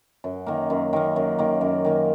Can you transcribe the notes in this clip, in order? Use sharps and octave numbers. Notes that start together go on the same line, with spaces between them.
F#2
D#3 A#3
F#2
D#3 A#3
F#2
D#3 A#3
F#2
D#3 A#3